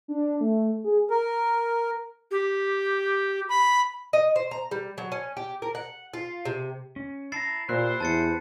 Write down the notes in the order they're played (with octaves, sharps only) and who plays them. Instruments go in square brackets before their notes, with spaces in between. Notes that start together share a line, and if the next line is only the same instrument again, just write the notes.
[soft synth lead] D4
A3
G#4
[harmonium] A#4
[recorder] G4
B5
[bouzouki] D#5
C5
A#5
G3
F#3
C#4
G4
A#4
F#5
F4
C3
[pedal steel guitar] C#4
[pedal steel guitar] E4 A5 A#5 [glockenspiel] A6 C7
[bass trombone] A#2 [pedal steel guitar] E4 G4 [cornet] C5 [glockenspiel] F#6
[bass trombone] E2 [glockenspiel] A5 A6 C#7